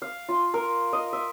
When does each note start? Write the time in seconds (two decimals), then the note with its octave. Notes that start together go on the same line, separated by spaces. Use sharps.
0.02 F5
0.29 F4
0.54 A#4
0.93 D#5
1.13 E5